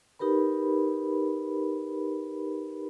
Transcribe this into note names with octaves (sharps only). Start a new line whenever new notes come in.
D#4 G4 A#4 B4 B5